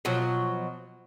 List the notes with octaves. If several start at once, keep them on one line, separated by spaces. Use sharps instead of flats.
B2 F3 F#3